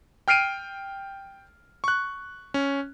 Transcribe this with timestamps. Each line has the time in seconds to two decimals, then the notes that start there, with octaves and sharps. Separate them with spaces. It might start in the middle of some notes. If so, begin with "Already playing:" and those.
0.28 G5 F6 C7 D7 D#7
1.84 C#6 F#6
2.54 C#4